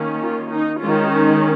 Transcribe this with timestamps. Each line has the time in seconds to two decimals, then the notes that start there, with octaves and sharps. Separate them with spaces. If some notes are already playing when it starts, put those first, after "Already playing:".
Already playing: D#3 A#3 C#4
0.22 F4
0.50 D#4
0.79 D#3 G#3 C#4 F4
1.08 D#4